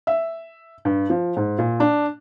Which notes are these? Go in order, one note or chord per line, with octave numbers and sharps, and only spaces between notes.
E5
G2
F3
G#2
A#2
D4